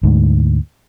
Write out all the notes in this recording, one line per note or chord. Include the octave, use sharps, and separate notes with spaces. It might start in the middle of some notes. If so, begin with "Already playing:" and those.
D2 G#2